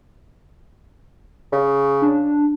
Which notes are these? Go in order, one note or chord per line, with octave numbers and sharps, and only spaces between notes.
C#3
D4